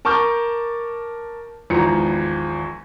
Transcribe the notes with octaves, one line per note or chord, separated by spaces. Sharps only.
A#4 A5 C#6 D6 F6 G6
G#1 E2 F3 A#5 C#7